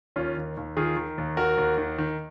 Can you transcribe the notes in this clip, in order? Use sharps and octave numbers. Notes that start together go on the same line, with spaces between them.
D#2 C#4 F4
D#3
D#2
D#3 F4 G#4
D#3
D#2
D#3 F#4 A#4
D#2
D#3
D#3